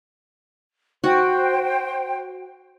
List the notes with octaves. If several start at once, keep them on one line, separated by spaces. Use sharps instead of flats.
F#4 C5 G5